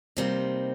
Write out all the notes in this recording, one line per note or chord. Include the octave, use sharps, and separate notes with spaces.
C3 G3 A#3 C4 D#4